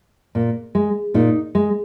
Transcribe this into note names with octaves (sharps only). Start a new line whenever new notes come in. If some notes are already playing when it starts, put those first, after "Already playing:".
A#2
G#3
A#2 D#4
G#3